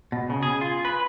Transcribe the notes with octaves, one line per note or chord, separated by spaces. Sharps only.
B2
C#3
G#4
F4
B4